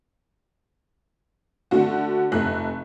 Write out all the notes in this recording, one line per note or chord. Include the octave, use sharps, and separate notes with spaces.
D3 A3 F#4
F1 A3 F#6